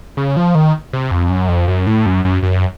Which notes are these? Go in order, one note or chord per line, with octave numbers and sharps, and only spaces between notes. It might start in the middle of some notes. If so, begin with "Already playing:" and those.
C#3
F3
D#3
C3
F2
F#2
F2
F#2
A2
F#2
F#2
F#2